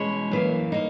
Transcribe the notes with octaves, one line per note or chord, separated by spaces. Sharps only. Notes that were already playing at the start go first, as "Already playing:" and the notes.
Already playing: E2 B2 G#3 C#4 E4 C#5
F#2 E3 A#3
A#3 D#4